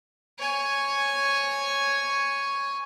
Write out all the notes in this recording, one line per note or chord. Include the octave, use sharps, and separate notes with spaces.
C#5 G#5